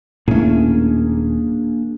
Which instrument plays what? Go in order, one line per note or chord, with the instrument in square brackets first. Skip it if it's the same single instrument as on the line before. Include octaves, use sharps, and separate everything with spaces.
[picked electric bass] D#1 C#4 [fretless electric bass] A2 A3 [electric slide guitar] A#3 D4 G#4